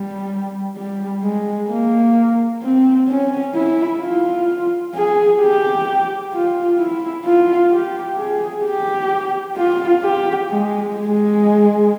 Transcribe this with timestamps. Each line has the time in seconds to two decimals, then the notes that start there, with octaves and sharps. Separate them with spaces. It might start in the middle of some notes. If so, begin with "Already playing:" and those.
Already playing: G3
0.77 G3
1.23 G#3
1.70 A#3
2.62 C4
3.09 C#4
3.54 E4
4.01 F4
4.94 G#4
5.41 G4
6.33 F4
6.79 E4
7.25 F4
7.71 G4
8.17 G#4
8.64 G4
9.57 F4
10.03 G4
10.50 G#3
10.96 G#3